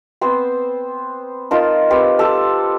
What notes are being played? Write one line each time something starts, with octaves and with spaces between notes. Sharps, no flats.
B3 C4 C5
D#4 F4 A#4 A5
C4 G4 B4
G4 A4